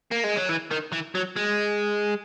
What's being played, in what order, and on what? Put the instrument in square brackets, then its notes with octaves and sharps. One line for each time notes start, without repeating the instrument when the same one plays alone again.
[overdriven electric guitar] A#3
G#3
F#3
E3
D#3
E3
F#3
G#3